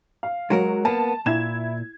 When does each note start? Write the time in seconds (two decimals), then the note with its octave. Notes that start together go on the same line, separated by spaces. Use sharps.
0.23 F5
0.50 F#3 G#3 F#4 A#4
0.85 A#3 B3 A5
1.26 A#2 E4 G#6 E7